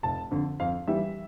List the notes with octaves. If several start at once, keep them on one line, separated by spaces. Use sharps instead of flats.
F1 A5
F2 D3
F2 F5
E3 G3 E5